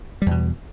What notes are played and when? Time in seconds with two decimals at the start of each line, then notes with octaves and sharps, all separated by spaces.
0.22 G3
0.26 E2
0.31 B2